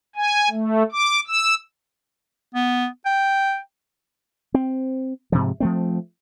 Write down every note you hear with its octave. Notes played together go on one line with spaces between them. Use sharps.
G#5
A3
D6
E6
B3
G5
C4
G#2 C3 F3
F3 A3 C4